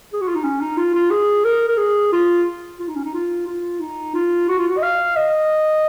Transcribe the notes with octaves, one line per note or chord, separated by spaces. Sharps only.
G#4
F#4
F4
D#4
C#4
D#4
F4
F4
G#4
A#4
A#4
G#4
F4
F4
D#4
C#4
D#4
F4
F4
D#4
F4
F#4
F4
F#4
D#5
F5
D#5